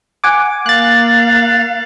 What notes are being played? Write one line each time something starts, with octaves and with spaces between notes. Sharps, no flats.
F#5 G#5 D6
A#3 F5 F#6 A6